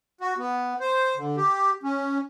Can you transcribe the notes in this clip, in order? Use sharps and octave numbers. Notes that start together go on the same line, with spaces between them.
F#4
B3
C5
D3
G4
C#4